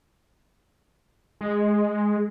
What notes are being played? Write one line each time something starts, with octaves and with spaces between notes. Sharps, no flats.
G#3